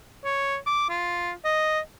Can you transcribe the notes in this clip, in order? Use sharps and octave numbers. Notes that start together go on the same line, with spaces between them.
C#5
D6
F4
D#5